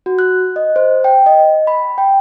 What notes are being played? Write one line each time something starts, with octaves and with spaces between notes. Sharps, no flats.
F#4
F#6
D#5
C5
G5
D#5
B5
G5